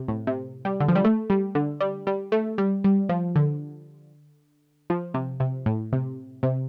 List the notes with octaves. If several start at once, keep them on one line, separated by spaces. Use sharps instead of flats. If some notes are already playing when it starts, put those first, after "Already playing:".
Already playing: C3
A2
C3
G3
D3
F3
G3
A3
G3
D3
G3
G3
A3
G3
G3
F3
D3
F3
C3
C3
A2
C3
C3